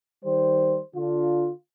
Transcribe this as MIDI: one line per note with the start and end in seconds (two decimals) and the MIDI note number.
0.25 0.79 51
0.25 0.79 55
0.25 0.79 72
0.95 1.51 50
0.95 1.51 62
0.95 1.51 65